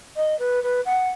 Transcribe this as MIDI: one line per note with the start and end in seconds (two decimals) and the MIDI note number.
0.16 0.38 75
0.39 0.63 71
0.63 0.81 71
0.85 1.09 78